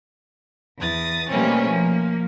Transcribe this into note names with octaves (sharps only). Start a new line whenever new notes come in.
E2 D#6 A6
B2 G3 A3 A#3 C4 C#4
F3 A#3